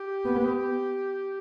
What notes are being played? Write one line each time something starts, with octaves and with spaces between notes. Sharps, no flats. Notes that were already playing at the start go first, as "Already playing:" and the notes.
Already playing: G4
B3